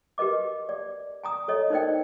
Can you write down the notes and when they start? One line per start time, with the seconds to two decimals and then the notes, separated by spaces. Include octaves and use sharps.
0.18 G4 A#4 B4 D#5 D6
0.69 D5
1.24 G#5 A#5 D#6
1.48 A4 C#5 D#5
1.70 D#4 A#4 C5 D5 D#5 G5